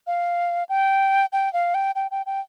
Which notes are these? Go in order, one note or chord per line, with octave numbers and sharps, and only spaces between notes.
F5
G5
G5
F5
G5
G5
G5
G5